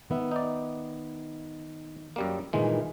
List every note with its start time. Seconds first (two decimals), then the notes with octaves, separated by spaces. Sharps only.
0.10 D#3 B3 E5
0.31 D#4 D5
2.16 F#2 G3 A#3
2.53 G2 A#2 D#3 E3 G#3